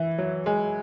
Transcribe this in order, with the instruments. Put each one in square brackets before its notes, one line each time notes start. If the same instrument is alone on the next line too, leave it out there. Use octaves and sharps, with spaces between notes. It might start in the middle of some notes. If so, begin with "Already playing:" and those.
Already playing: [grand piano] E3 [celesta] E5
[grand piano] F#3 [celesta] C#5
[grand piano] G#3 [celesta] G#5